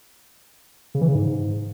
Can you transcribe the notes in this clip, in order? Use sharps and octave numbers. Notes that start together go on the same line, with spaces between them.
C#3
E3
C#3
G#2